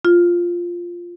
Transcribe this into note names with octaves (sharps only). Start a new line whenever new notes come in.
F4